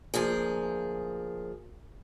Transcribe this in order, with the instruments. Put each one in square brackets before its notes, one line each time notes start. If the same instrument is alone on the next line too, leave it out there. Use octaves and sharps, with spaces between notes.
[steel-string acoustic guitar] D2 F3 A#3 G#4